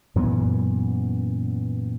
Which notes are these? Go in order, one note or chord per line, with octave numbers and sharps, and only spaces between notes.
F#2 A#2 E3 B3